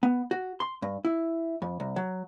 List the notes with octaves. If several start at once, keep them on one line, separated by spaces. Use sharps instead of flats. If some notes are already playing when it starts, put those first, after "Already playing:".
B3
F#4
C6
G2
E4
F2
C2
F#3